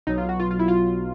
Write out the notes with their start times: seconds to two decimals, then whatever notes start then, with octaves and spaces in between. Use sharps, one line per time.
0.07 B1 B2 F#3 D#4
0.18 F4
0.29 F#4
0.40 F4
0.51 F4
0.59 E4
0.68 F4